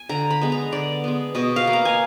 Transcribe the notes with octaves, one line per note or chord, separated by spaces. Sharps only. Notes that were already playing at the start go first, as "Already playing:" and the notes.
Already playing: G#5
D3 A#5
B5
G#3 B3
A#5
D3 D5
G#3 B3
B2 D#5
F5
A#3
A#5
G#5